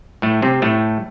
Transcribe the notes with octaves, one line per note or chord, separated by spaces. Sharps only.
A2 A3
C3 C4
A2 A3